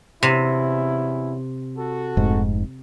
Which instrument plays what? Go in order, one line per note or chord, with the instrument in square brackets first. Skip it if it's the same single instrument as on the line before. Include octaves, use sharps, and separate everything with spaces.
[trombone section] E2 C#4 E4 [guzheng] C3
[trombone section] F#4 A4
[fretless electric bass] F1 G#2